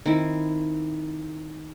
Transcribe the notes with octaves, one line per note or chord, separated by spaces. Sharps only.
D#3 C4 E4